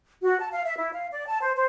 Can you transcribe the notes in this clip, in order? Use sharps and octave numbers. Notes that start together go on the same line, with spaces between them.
F#4
A5
F5
E5
E4
F5
D5
A5
C5
C5